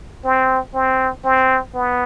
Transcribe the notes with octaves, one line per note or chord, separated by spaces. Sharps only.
C4
C4
C4
B3